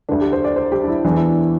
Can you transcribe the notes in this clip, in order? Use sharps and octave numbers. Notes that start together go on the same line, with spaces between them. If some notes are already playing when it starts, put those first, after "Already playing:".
D2 D3 D4
G4
C5
D5
C5
G4
D4
E4
E2 E3 D4
E4
D4